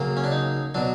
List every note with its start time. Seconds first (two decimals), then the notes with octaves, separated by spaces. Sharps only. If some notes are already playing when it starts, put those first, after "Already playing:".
Already playing: C#3 F#3 A#3
0.17 C#4
0.24 D4
0.31 D#4
0.74 B2 F#3 D4